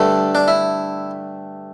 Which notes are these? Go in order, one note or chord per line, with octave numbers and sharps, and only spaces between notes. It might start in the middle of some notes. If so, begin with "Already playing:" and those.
Already playing: G2 D3 A3
D4
E4